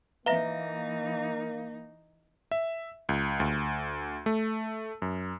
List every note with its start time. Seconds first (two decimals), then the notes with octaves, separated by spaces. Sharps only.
0.26 E3 A#3 D#4 B4 E5 F5 A#5 A#6
2.51 E5
3.09 C#2
3.40 D2
4.26 A3
5.02 F#2